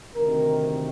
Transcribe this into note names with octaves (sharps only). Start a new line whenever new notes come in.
D2 C3 D#3 A#4